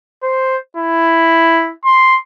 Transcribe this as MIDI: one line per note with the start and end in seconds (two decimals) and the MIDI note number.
0.23 0.57 72
0.77 1.72 64
1.85 2.17 84